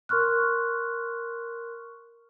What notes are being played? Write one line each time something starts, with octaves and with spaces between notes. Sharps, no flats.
A#4 C6 C#6 F6 F#6